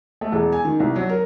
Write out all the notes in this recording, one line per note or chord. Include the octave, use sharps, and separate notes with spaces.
A3
E1
G#5
D#3
C2
F#3
A#4